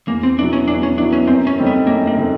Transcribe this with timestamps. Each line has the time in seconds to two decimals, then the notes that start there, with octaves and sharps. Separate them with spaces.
0.08 E2 A#3
0.23 C4
0.38 B2 F#3 B3 D4 E4
0.53 C#4
0.68 E2 D4
0.83 C#4
0.98 B2 F#3 B3 D4 E4
1.13 C#4
1.27 F#2 C4
1.47 C#4
1.58 D3 G3 C4 D#4
1.67 B3
1.87 F#2 A#3
2.07 A#3
2.17 D3 G3 C4 D#4